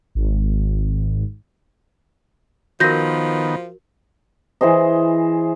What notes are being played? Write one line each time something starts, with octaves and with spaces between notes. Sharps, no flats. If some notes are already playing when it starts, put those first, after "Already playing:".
G#1
D#3 F3 B3 F#4 A#4 G6 A#6
E3 G#4 C5 D#5